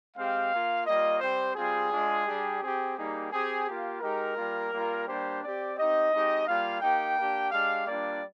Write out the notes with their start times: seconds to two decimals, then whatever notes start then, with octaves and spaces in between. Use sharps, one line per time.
0.16 G#3 C4 G4 F5
0.51 A#3 F4
0.86 G3 A#3 F4 D#5
1.20 G3 C4 G4 C5
1.55 G3 C4 F4 G#4
1.90 G#3 D4 F4
2.26 G3 D4 G4
2.61 C4 G4 G#4
2.96 G3 A#3 D#4 G4 G#4
3.31 C4 G4 G#4
3.66 A#3 F4 G4
4.00 G#3 D#4 G4 A#4
4.36 G3 A#3 F4
4.71 G3 A#3 F4
5.06 G3 A#3 D4 G4 C5
5.41 C4 G4 D5
5.76 C4 D#4 G4 D#5
6.11 G#3 C4 D#4 G4
6.46 G3 A#3 F4 F5
6.81 A#3 D#4 G4 G5
7.16 A#3 D4 G4
7.51 G#3 D4 G4 F5
7.86 G3 A#3 D4 F4 D5